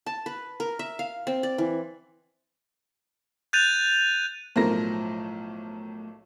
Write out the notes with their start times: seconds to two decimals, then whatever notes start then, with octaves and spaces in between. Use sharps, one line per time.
0.06 A5
0.26 B4
0.60 A#4
0.79 E5
0.99 F5
1.27 C4
1.43 D5
1.58 E3
3.53 F#6 G6 A6 D#7 F7
4.56 B1 A2 F3 A#4 C5 A#6